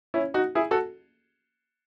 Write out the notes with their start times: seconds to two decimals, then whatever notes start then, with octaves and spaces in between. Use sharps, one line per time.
0.14 C#4 E4
0.34 D#4 F#4
0.55 E4 G#4
0.71 F#4 A4